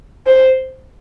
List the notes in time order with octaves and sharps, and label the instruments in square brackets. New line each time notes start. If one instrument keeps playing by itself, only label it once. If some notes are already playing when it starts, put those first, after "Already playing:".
[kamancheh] C5